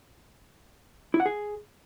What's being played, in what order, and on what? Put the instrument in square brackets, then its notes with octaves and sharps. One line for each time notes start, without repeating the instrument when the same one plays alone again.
[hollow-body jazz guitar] E4
F#5
G#4